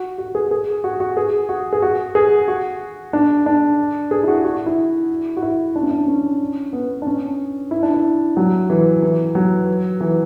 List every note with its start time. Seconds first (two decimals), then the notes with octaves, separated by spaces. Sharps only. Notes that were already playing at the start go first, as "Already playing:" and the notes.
Already playing: F#4
0.18 F#4
0.35 G#4
0.51 G#4
0.84 F#4
1.00 F#4
1.17 G#4
1.49 F#4
1.73 G#4
1.82 F#4
2.15 G#4
2.48 F#4
3.13 D4
3.46 D4
4.11 G#4
4.23 E4
4.28 F#4
4.44 F#4
4.55 F#4
4.66 E4
5.37 F#4
5.42 E4
5.75 D4
5.82 C#4
5.91 D4
6.08 C#4
6.73 B3
7.02 D4
7.07 C#4
7.71 E4
7.83 D4
7.94 E4
8.37 F#3
8.70 E3
9.03 E3
9.35 F#3
10.01 E3